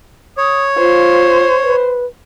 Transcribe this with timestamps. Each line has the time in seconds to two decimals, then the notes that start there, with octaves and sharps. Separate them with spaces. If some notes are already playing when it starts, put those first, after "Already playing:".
0.38 C#5 D#6
0.78 F4 C5
1.63 B4